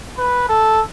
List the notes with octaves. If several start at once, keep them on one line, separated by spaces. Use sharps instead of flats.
B4
A4